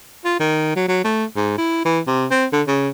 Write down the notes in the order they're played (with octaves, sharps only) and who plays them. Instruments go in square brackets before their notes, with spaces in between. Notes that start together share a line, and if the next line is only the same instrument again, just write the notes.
[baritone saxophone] F4
D#3
F#3
F#3
A3
G#2
E4
E3
C3
C4
D3
C#3